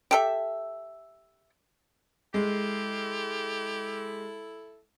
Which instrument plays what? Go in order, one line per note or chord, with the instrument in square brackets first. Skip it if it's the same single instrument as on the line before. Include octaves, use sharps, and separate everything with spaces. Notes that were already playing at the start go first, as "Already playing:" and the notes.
[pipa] G4 A4 E5
[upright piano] G#3 [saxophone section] E4 A4 [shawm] G4